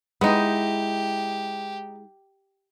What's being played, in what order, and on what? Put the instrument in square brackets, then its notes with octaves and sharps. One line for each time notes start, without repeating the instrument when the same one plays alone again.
[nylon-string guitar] G#3 E4 [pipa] B3 D#4 [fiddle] G4